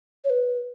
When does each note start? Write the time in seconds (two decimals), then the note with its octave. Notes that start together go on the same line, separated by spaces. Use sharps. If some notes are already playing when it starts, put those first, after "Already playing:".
0.25 C#5
0.30 B4